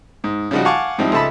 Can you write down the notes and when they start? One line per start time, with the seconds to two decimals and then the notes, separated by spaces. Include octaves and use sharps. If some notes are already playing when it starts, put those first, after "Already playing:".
0.24 G#2
0.51 C#3 F3 G3 D#4 F#4
0.65 F5 F#5 G#5 A5 C#6 D6
0.98 G#2 F3 G3 C4 D#4 E4
1.12 C#2 A4 D#5 E5 A5 B5